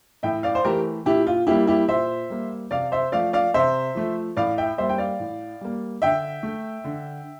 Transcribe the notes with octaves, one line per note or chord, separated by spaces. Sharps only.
A2 E5 G5
D5 F5
C5
E3 A3 G4 A#4
A#2 E4 G4
F4
G3 A#3 E4 G4
E4 G4
A#2 C5 E5
G3 A#3
C3 D5 F5
C5 E5
F3 A3 D5 F5
D5 F5
C3 C5 E5
F3 A3
A2 D5 F5
E5 G5
G3 A#3 C5 E5
G5
D5 F5
A2
G3 A#3
D3 E5 G5
A3
D3